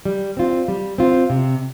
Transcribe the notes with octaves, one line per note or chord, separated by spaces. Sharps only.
G3
C4 F4
G3
C4 F4
C3